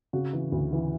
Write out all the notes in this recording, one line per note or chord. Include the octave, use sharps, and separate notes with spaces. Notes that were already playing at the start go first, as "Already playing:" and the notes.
C#3 F#4
E3
D2
E3